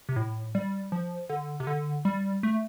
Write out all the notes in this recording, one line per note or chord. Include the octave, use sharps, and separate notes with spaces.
C3
A2
G3
F3
D3
C3
D3
G3
A3